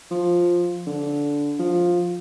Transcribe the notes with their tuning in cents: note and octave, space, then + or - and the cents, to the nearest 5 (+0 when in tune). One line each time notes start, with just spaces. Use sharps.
F3 +5
D3 -15
F3 +10